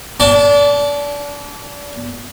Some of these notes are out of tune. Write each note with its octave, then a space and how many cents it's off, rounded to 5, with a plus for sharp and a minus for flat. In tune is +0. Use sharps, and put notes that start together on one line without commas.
D4 -30 A5 +0